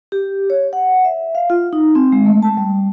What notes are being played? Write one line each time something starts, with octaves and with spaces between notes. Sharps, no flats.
G4
C#5
F#5
E5
F5
F4
D#4
C4
G#3
A3
A5
G3